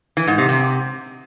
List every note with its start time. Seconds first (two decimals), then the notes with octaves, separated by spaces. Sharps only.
0.17 E3
0.27 G#2
0.38 C3
0.49 C3